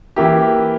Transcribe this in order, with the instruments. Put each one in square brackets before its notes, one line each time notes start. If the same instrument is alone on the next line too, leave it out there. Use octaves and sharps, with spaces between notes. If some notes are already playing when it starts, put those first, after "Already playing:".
[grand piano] E3 A#3 E4 G4